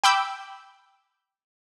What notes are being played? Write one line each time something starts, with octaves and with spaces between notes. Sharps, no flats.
G5 B5 D6 E6 G6